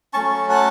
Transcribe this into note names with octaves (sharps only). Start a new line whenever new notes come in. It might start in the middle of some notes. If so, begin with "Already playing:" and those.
F#3 A3 C#4 A5 C#6
F#5 A5